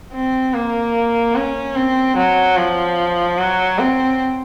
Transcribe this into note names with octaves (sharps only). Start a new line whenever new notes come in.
C4
A#3
C#4
C4
F#3
F3
F#3
C4